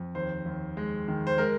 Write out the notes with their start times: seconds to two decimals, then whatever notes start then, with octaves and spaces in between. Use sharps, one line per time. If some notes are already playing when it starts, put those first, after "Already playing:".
Already playing: F2
0.15 D#2 C5
0.46 D#2
0.77 G#3
1.08 D#3
1.27 C5
1.38 G#3 A#4